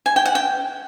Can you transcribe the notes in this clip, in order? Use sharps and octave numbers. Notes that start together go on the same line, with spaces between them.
G#5
G5
F#5
G5